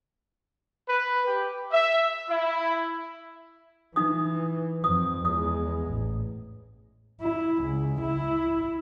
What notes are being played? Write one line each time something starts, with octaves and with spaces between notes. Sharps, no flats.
B4
G4
E5
E4
E3 D#4 D#6
F2 D#6
E2 G#3 D#6
A1
E4
C#2
E4